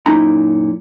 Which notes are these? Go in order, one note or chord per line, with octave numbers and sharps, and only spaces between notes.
F#2 A#2 D#4 E4 A#5 B5